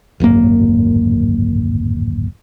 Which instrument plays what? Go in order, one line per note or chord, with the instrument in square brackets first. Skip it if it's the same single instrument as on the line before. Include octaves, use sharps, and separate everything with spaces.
[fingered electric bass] D1 G#1 F#2 A#3